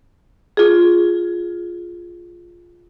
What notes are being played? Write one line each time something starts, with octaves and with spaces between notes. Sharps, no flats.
F4 G#4